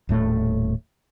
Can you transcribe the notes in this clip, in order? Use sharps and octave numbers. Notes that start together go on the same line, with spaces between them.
D#1 A2 A3